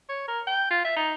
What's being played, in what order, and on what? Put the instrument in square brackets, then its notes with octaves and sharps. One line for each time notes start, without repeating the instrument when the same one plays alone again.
[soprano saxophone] C#5
A#4
G5
F4
E5
D#4